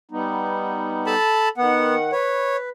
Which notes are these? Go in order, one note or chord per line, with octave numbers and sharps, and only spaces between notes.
G3 B3 D#4
A4 A5 B5
D#3 B3 F#5
B4 C#5